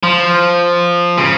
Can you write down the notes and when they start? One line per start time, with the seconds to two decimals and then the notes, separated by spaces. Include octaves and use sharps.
0.03 F3
1.18 C#3